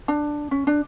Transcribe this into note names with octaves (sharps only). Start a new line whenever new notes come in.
D4
C#4
D4